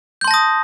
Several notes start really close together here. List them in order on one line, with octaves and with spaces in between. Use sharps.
G6 C6 A5 A#6 D#6